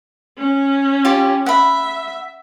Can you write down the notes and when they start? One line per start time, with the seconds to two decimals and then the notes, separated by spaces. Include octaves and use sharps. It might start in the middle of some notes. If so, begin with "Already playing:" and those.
0.38 C#4
1.05 F4 G4
1.46 E5 F#5 B5